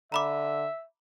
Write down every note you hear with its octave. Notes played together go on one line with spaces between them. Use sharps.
D3 E5 A#5 B5 D6